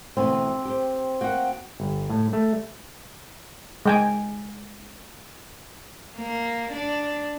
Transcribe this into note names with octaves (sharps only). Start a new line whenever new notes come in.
D2 B2 E3 C4
G4 C5
A#3 F#4 F#5 G5
G1
A2
A3
G#3 G5 G#5
A#3
D4